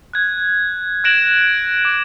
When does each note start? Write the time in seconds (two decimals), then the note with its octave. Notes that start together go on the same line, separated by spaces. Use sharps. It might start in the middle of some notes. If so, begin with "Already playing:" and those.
0.13 F#6 G#6
1.04 F#6 G#6 A#6 D7 E7 F#7
1.85 D6